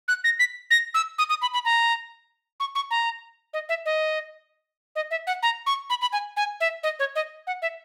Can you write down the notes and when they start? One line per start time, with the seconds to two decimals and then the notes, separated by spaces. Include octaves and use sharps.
0.08 F#6
0.24 A#6
0.39 B6
0.71 A#6
0.94 E6
1.18 D#6
1.30 D#6
1.42 B5
1.54 B5
1.65 A#5
2.60 C#6
2.75 C#6
2.91 A#5
3.54 D#5
3.69 E5
3.86 D#5
4.96 D#5
5.11 E5
5.27 F#5
5.43 A#5
5.66 C#6
5.90 B5
6.01 B5
6.13 G#5
6.37 G#5
6.60 E5
6.83 D#5
6.99 C#5
7.16 D#5
7.47 F#5
7.62 E5